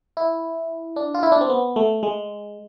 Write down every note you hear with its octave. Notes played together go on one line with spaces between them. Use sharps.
E4
D4
F4
E4
D4
C4
B3
A3
G#3